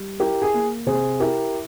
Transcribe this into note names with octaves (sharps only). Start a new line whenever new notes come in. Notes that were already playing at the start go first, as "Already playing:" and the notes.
Already playing: G3
E4 G4 A#4
G#4
A#3
C3 G#4 C5
E4 G4 A#4